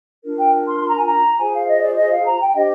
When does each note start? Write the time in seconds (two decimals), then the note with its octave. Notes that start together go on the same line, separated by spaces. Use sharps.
0.24 D4 F4 A#4
0.38 G5
0.67 C6
0.82 C6
0.88 A#5
0.97 G#5
1.04 A#5
1.39 F4 G#4 C5 G#5
1.54 F5
1.68 D#5
1.82 D5
1.96 D#5
2.11 F5
2.25 A#5
2.40 G5
2.55 D4 G4 C5 D#5